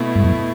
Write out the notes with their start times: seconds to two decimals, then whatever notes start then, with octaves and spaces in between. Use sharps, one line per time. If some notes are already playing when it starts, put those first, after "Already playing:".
Already playing: B2 A3 E4
0.15 G2
0.25 F#2